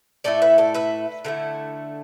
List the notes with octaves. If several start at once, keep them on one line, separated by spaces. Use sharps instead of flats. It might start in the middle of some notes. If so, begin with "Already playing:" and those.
A2 A3 E4 A4 D5
B4 E5
A4 D5
B4 E5
D3 A3 E4